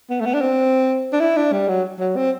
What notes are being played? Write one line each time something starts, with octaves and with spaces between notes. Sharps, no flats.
B3
A3
B3
D4
C4
D4
E4
D4
G3
F#3
F#3
C4